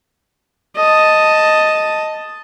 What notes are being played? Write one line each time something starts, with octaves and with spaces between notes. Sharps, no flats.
D#5 A5